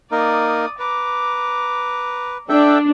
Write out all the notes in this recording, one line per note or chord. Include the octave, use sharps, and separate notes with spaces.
A#3 D#4 A#4 D5 D#6
B4 A#5 D6
D4 A4 E5 G5